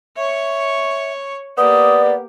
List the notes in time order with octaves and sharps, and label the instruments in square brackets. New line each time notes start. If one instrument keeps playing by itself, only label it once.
[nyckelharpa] C#5 C#6 [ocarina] E5
[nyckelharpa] A#3 G4 [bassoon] B3 [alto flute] D5 [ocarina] D#6